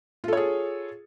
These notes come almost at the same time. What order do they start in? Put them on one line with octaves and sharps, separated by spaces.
F4 A4 C#5 G#4